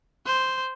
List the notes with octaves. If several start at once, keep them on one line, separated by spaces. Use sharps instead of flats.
C5